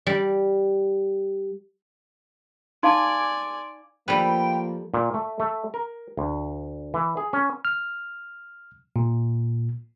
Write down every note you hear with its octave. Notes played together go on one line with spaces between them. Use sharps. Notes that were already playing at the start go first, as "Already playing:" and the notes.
G3
D#4 D5 F5 G#5 A5 C6
F3 G3 A3 A#3 B4 G5
A#2
A3
A3
A#4
D2
E3
G#4
C#4
F6
A#2